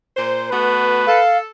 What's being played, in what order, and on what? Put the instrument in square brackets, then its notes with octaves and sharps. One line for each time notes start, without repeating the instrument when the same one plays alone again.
[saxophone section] A#2 C5
[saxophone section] A3 B3 F#4 [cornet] B4
[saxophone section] A4 [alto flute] F5